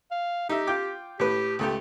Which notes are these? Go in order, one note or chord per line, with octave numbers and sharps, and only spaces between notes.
F5
D#4 G4 E5
F4 G5 D6
A2 G4 B4
C#2 A3 G4